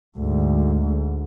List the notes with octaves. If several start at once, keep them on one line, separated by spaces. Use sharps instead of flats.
D2 G#2